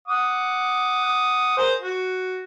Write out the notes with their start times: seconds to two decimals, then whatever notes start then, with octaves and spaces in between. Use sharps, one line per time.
0.08 F#5 D6 D#6
1.58 G#4 A#4 C5
1.80 F#4